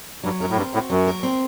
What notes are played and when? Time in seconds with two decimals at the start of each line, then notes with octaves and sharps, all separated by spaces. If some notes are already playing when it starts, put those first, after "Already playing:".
0.23 G2 F#3
0.41 F#2 A#4
0.49 A2
0.57 G2 C4
0.73 A2 F#4
0.90 F#2 F#3
1.07 A#4
1.23 C4